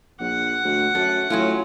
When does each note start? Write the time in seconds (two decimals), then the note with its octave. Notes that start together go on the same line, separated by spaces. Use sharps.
0.20 A#1 F#5
0.64 D2
0.95 F#2 A3
1.30 A2 F#3 C#4 F4